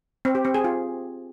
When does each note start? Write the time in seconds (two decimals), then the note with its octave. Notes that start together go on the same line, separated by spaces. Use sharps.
0.25 C4
0.35 G4
0.45 C4
0.55 G#4
0.64 F4